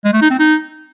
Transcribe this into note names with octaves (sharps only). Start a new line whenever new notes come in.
G#3
A3
D#4
C4
D#4